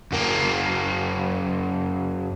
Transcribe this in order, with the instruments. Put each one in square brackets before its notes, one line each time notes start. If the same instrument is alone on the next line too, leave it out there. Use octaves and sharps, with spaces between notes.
[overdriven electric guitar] F#2 A#3